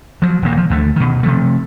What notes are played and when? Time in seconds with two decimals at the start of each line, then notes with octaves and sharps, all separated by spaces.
0.22 F3 F#3
0.42 D#1 D2 A#3
0.57 F3
0.70 D2 D3 A3
0.96 B2 D#3
1.23 C3 F3 A3